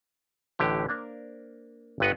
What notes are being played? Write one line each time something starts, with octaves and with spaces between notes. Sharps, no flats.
A1 A2 D3 G4
A#3 D4 A#4 C5
G1 G2 B3 B4 D#5 F#5